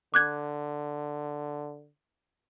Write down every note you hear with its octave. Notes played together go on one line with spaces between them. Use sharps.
D3 D6 F#6 G#6